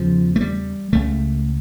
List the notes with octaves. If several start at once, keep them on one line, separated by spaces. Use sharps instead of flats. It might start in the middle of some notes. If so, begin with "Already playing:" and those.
Already playing: E2 C#3 F3
A3
G3
C#2 C#3 A3